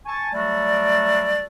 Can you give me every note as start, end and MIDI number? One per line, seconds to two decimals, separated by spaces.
0.06 0.29 80
0.06 0.29 81
0.06 0.29 85
0.33 1.46 54
0.33 1.46 55
0.33 1.46 57
0.33 1.46 66
0.33 1.46 69
0.33 1.46 74